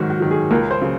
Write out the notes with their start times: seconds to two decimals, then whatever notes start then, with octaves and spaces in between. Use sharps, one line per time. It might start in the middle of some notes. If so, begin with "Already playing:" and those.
Already playing: G#2 D#3 F#3 F#4
0.10 F#4
0.20 D#3 F#3
0.31 G#4
0.51 C#2 A#4
0.71 C5
0.81 C#3 F#3